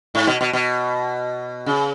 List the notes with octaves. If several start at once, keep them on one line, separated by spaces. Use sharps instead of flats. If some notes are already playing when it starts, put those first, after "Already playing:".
G#2
B2
B2
B2
C#3